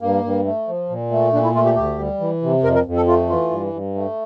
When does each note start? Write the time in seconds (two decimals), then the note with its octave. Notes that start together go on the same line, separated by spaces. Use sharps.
0.01 G2 A#3
0.24 G2
0.45 A3
0.68 F3
0.90 A#2
1.11 A3
1.33 A#2 D4
1.43 E4
1.55 A3 F4
1.66 G4
1.76 D2 G4
1.99 G3
2.20 E3
2.42 C3
2.63 F2 A#4
2.75 A#4
2.85 F2
2.96 A4
3.07 A3 F4
3.29 E3 F4
3.50 G2
3.73 G2
3.95 A3